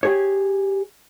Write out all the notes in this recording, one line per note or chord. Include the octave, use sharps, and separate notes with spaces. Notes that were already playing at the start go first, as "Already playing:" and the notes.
G4 G#4 C#5